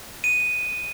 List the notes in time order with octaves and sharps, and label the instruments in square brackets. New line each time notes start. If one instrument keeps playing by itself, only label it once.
[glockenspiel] D#7